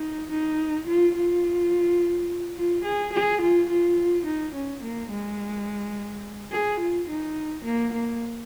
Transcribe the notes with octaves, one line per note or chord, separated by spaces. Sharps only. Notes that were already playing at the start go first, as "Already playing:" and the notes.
Already playing: D#4
D#4
F4
F4
F4
G#4
G#4
F4
F4
D#4
C#4
A#3
G#3
G#4
F4
D#4
A#3
A#3